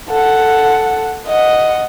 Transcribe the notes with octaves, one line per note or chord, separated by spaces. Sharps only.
A4 F#5
D#5 F#5